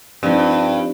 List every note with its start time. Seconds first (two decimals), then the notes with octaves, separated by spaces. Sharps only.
0.23 G2 F3 C4 D#4